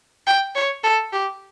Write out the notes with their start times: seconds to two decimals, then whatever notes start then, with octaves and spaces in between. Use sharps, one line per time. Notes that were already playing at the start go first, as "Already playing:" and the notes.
0.27 G5
0.55 C#5
0.83 A4
1.13 G4